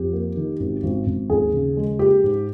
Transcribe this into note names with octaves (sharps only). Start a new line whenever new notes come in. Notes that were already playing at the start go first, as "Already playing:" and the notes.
Already playing: F2 G4
A#3
D#3
G#1
G#1
G#1
D#2 G#4
C#3
G#3
A#3 G4
G#2